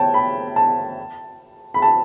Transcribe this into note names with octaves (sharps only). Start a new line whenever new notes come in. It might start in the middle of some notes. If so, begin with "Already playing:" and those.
Already playing: C#5 G5 A5
B5
A5
B5
A5